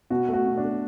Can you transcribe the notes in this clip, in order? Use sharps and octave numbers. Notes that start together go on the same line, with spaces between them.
B2 F#4
A3 F#4
B2
D4
A3